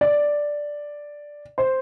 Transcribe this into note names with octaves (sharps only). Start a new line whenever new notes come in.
D5
C5